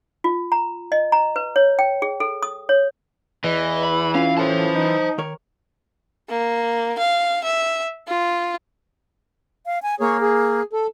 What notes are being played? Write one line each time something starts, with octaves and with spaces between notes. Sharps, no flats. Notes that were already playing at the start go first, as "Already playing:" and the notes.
F4
A#5
D#5
A#5
B4
C#5
G5
G#4
A4
D#6
C#5
E2 E3 D#5
B5
C#4 F4 F5
A2 C5 A5
D#4
D#3 A#4 C#5
A#3
F5
E5
F4
F5
G#5
A#3 G#4 C#5
G#4
A4